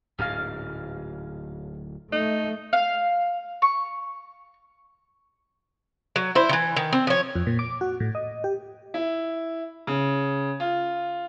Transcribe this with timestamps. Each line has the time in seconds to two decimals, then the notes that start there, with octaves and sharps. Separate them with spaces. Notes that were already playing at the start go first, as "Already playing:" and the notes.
0.19 D1 G#2 C#4 F5
2.12 A3 D#4
2.73 F5
3.62 C#6
6.16 F#3
6.35 E4 C5
6.49 D#3 E3
6.76 D#3
6.93 C4
7.07 F3 C#5
7.35 F2
7.47 A#2
7.59 D6
7.81 F#4
8.00 A2
8.15 D#5
8.44 G4
8.94 E4
9.87 C#3
10.60 F4